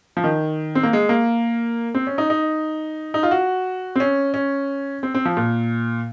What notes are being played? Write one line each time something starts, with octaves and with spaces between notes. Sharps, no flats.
F3
D#3
C4
A#3
G#3
A#3
C4
C#4
D#4
D#4
D#4
F4
F#4
C4
C#4
C#4
C4
C4
F3
A#2